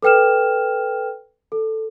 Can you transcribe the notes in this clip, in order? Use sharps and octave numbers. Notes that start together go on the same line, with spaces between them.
A4 B4 G5 F6 E7
A4